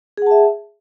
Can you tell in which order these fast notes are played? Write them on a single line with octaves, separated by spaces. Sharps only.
G#4 F#5 A5 E5